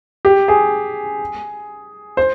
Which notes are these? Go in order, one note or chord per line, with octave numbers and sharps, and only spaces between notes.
G4
G#4
C5